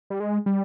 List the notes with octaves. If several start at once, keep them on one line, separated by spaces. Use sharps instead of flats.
G3
G#3
G3